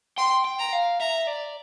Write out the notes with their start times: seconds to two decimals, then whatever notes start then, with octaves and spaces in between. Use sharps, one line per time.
0.18 G5 C6
0.45 G5
0.59 A#5
0.73 F5
1.00 E5 A#5
1.27 D5